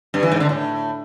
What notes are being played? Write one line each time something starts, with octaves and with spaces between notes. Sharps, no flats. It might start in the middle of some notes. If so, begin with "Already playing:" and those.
G2
E3
G#2
D3
A2